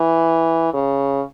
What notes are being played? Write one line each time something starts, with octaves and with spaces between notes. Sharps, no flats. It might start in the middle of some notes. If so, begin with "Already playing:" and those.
Already playing: E3
C#3